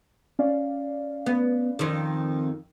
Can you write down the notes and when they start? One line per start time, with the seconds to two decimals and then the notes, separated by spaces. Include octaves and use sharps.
0.39 C#4 D5 F5
1.26 B3
1.79 F2 D#3